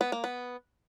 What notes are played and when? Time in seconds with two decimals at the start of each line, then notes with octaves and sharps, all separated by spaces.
0.01 B3
0.12 A#3
0.24 B3